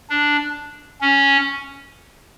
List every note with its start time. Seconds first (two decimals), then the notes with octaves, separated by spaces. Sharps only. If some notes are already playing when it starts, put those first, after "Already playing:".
0.10 D4
1.01 C#4